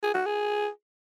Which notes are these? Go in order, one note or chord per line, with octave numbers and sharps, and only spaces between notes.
G#4
F#4
G#4